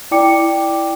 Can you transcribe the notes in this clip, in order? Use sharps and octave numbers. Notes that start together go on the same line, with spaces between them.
E4 D5 G5 D6 C#7